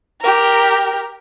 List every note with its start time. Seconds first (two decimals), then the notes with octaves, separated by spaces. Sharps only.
0.21 G4 A#4